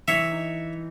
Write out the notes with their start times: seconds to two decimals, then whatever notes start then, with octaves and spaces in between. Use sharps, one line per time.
0.08 E3 C#5 E5
0.31 D#4